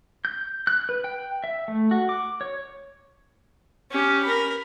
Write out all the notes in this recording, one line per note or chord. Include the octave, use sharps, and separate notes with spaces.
G6
F#6
B4
G5
E5
A3
F#4
D6
C#5
C#4 G4
A#4 B5